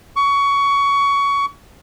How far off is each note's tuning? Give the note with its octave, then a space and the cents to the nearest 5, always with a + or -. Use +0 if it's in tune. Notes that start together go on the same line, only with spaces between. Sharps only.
C#6 +20